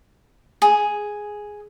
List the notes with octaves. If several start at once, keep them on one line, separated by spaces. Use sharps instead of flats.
G#4